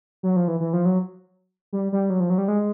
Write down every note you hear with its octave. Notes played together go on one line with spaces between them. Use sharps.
F#3
F3
E3
E3
F3
F#3
G3
G3
F#3
F3
F#3
G3
G#3